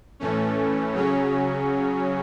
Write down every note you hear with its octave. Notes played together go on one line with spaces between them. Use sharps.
A2 E3 A3 C#4
C#3 F#3 C#4